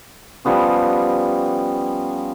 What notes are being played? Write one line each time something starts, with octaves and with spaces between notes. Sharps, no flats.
F3 G3 B3 C#4